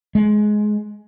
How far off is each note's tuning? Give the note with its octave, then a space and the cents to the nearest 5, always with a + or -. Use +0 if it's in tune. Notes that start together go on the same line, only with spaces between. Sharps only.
G#3 +15